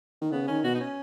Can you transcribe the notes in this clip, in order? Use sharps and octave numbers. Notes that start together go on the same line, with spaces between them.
D#3
C#3 B3
D#3 C#4
B2 F#4
D#4
C#4